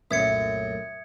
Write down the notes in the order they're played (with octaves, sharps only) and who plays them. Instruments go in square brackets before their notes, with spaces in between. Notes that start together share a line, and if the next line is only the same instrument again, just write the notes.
[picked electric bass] C2 A#2 A3 [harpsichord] F#2 [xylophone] E5 [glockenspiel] D#6 G#6 C#7